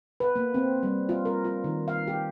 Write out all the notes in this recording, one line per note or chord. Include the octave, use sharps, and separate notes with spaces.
B4
A#3
C4
G3
F4
A#4
F4
D#3
F5
G4